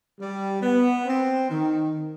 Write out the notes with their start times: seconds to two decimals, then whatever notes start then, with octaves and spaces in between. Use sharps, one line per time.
0.19 G3
0.61 B3
1.06 C4
1.50 D#3